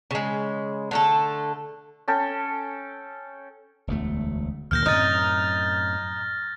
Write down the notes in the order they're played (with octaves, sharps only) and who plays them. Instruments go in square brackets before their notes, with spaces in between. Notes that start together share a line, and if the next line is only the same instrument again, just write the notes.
[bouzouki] C#3 G#3
D3 A3 A4
[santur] C#4 A4 G5
[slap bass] E1 D2 A3
[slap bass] D2 A#2 D#3 [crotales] F6 G6 A#6
[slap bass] F#2 A2 C4 [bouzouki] D#4 [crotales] F6 A6